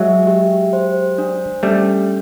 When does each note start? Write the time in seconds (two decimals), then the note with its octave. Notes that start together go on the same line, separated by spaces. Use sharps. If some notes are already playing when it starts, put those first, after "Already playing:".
Already playing: F#3 G#3 E5
0.27 G4
0.73 C5
1.18 D4
1.63 G3 A3 C#4